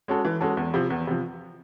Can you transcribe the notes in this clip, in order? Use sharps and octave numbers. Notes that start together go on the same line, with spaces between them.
G#3 C#4 F#4 A4
E3
G#3 C#4 F#4 A4
E2
C3 F3
E2
C3 F3